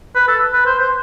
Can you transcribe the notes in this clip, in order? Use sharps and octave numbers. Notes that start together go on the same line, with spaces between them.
B4
A4
B4
C5
C5